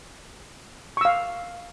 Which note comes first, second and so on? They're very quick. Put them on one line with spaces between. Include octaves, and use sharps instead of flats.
C#6 E6 F5